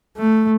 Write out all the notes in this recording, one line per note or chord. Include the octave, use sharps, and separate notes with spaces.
A3